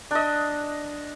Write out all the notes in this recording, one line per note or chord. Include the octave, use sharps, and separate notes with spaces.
D4 D#5